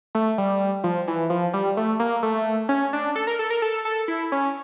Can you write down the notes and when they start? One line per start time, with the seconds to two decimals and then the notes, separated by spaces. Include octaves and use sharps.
0.15 A3
0.38 G3
0.84 F3
1.08 E3
1.30 F3
1.54 G3
1.77 A3
2.00 A#3
2.23 A3
2.69 C#4
2.93 D4
3.16 A4
3.27 A#4
3.39 A4
3.50 A#4
3.62 A4
3.85 A4
4.08 E4
4.32 C#4